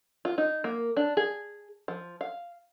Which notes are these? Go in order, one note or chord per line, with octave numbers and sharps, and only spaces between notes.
F4
D#4
A#3
D4
G#4
F3
F5